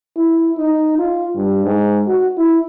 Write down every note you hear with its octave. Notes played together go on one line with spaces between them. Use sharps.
E4
D#4
F4
G2
G#2
F#4
E4